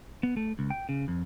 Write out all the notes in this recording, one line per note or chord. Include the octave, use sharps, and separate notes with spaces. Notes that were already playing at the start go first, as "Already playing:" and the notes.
B3
A3
C#2
G5
C#3
F2